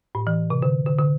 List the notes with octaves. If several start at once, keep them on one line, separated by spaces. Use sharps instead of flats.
A2
E3
C3
D3
D3
D3